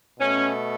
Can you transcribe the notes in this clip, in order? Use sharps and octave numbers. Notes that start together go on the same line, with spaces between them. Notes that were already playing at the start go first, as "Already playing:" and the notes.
B2 A3 C#4